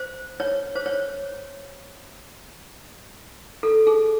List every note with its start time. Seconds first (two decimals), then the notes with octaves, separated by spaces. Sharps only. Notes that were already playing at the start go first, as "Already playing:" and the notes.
Already playing: C5
0.40 C#5
0.75 C5
0.86 C#5
3.63 A4
3.87 G#4